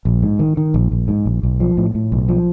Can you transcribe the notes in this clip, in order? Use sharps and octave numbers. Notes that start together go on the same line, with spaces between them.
A#1
G#2
D#3
D#3
A#1
A#1
G#2
A#1
B1
F3
A2
A2
B1
F3